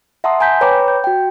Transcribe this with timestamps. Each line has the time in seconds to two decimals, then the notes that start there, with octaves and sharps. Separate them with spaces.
0.24 E5 F#5 A5 A#5 C6 D#6
0.40 G#5 A#5 G6 B6
0.61 B4 C#5 G5 A#5 B5 D6
0.88 G6
1.04 F#4 G5